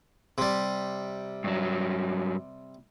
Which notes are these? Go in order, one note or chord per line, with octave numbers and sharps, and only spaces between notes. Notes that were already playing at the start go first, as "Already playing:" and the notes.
C3 G3
G2 F#3